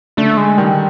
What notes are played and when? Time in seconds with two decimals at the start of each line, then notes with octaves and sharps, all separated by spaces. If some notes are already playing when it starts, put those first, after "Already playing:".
0.17 D3 A3
0.37 G#3
0.58 D#3 G3